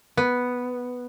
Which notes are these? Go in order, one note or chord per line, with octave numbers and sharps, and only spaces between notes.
B3